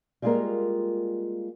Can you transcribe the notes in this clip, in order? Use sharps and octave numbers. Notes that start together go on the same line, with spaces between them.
G3 G#3 A#3 F4 G#4 A#4